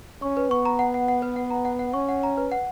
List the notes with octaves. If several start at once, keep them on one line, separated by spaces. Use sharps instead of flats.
C#4 C#6
B4
B3 C#6
A#5
F#5
F#5
F#5
B4
F#5
A#5
F#5
F#5
C#4 C#6
F#5
A#5
B4
F#5